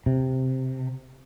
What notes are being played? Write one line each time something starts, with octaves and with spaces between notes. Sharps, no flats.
C3